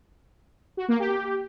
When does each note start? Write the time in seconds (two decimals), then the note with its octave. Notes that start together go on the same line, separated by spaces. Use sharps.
0.77 F#4
0.88 A#3
1.00 G4